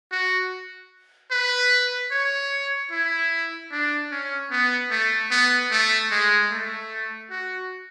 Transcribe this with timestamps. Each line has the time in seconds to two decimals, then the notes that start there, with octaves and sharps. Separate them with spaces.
0.12 F#4
1.32 B4
2.11 C#5
2.92 E4
3.71 D4
4.11 C#4
4.51 B3
4.91 A3
5.31 B3
5.71 A3
6.11 G#3
6.51 A3
7.31 F#4